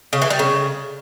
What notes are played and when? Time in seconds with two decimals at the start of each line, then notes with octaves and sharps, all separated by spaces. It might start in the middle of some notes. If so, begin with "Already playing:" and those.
0.13 C#3
0.22 E3
0.30 G3
0.39 C#3